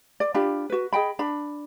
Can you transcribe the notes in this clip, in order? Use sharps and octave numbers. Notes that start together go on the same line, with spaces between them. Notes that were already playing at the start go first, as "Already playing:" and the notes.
D5
D4 F4 G4 B5
F#4 B4
G#4 D#5 G5 B5
D4 B5